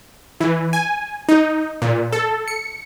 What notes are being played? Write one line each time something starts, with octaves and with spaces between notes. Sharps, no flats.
E3
G#5
D#4
A#2
A4
C#7